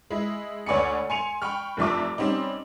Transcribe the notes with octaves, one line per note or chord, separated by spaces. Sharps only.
G#3 E4
D2 C#5 D5 G#5 B5 C#7
G#5 C6 C#7 D#7 F7
G5 B5 C#6 F6
F1 G2 F3 E5 A5 D6
G3 C4 C#4 D#4